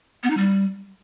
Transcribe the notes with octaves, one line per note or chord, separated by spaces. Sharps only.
B3
D#4
G3